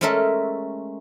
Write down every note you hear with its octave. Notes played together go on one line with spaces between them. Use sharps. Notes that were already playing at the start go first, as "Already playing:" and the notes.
G#3 A3 C#4 A4 A#4 E5